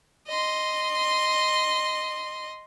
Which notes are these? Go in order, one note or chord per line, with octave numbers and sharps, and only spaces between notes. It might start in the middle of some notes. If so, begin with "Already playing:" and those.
D#5 C6